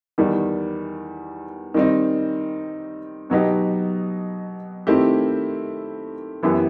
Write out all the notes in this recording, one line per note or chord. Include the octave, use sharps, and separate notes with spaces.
E2 D#3 G3
D#3 G3 C4 D#4
B2 F#3 B3 D#4 G4
D#3 A3 C4 E4 G4
F#2 E3 B3 E4 G4